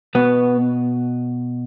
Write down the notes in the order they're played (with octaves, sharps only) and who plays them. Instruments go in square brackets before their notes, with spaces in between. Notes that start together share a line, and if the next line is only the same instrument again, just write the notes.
[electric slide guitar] B2 B3